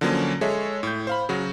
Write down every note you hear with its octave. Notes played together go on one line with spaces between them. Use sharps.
D3 F3 F#3 A#3 C#4
G#3 G#4 A4 C#5 E5
A2 G6
C5 F5 B5
C#3 F#3 F#4